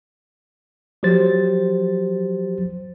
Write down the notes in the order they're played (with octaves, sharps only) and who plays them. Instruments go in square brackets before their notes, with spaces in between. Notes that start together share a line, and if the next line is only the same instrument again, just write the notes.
[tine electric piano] F3 F#3 G4 C5 A6